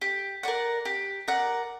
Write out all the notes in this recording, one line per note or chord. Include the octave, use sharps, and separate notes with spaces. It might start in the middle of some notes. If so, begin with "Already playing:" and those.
G4
A#4 D5 F#5
G4
A#4 D5 F#5